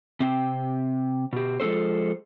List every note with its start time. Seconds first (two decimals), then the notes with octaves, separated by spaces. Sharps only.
0.20 C3 C4 G5
1.33 B2 G4
1.60 F3 G#3 C4 A4 C5